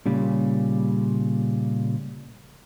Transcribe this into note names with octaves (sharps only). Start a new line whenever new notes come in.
A#2 C#3 G3